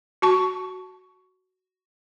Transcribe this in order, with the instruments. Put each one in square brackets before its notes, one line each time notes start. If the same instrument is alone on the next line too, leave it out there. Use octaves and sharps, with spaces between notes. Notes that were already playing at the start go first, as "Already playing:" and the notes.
[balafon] F#4 A5 C#6